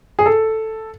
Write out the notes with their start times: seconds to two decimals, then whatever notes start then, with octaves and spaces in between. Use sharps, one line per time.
0.19 G#4
0.26 A4